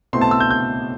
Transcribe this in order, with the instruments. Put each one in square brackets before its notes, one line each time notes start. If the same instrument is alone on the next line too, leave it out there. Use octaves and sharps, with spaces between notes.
[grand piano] B2 A3 C4 E4 C6
A5
E6
G6
G6